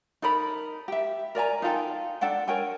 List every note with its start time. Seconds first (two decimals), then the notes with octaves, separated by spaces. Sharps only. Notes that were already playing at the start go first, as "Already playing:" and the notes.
0.22 D#4 A4 A#4 B5
0.88 G4 E5
1.35 A#4 D5 G#5 A#5
1.62 D#4 F4 A4 G5
2.21 D4 A4 F#5 G5
2.48 A#4 C#5 G5 G#5